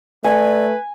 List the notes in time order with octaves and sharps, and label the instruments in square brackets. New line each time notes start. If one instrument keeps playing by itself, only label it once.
[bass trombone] A3 [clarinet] B4 [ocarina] D5 [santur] G#5